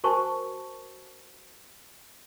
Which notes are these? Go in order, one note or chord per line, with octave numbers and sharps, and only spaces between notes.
F#4 A#4 C5 G#5 A5 C#6